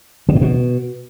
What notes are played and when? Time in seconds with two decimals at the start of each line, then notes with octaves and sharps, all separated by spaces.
0.29 C#3
0.35 A2
0.41 B2